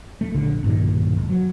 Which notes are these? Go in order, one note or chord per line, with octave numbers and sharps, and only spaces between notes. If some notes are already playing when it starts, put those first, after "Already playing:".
A3
A#1 D3
B1 G2 A#2 D#3
E1
F#3